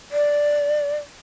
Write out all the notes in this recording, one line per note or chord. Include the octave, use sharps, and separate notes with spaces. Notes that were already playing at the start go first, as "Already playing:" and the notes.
D5